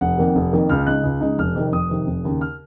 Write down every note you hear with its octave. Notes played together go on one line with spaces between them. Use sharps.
F1 F#5
F2 D#3 A#3
F1
F2 D#3 A#3
C#2 F6
C#3 G#3 D#4 F#6
C#2
C#3 G#3 D#4
F1 F6
F2 C3 D#3
F1 D#6
F2 C3 D#3
F1
D#2 C#3
F6